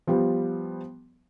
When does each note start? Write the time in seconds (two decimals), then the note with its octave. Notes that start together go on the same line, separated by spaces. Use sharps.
0.07 F3 G3 B3